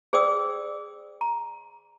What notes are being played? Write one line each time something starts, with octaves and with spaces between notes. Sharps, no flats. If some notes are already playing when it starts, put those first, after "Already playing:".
G#4 C5 D5 G5 D#6 E6
A#5